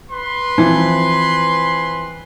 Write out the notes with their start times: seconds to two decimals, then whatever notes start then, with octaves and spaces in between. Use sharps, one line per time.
0.11 B4 C6
0.58 E3 F3 C4